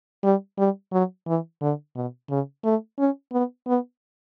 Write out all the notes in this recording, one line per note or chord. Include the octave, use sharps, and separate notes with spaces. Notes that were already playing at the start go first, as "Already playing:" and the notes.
G3
G3
F#3
E3
D3
B2
C#3
A3
C#4
B3
B3